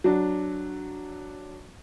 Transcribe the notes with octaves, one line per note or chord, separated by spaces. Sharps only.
F#3 D4